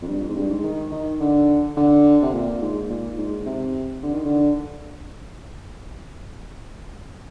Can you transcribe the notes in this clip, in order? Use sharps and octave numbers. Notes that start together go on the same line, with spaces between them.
F2
G2
F2
G#2
G2
G#2
D#3
D#3
D3
D3
C3
A#2
G#2
A#2
G#2
C3
D3
D#3
D3